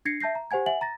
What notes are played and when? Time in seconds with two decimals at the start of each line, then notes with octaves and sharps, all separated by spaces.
0.05 D4 G#6 A#6 C7 C#7
0.20 E5 A5 G6 A#6 C7
0.35 A#5
0.51 G4 C5 F#5 G#5 G#6
0.66 E5 F#5 G#5 F#7
0.81 A#5 A6 A#6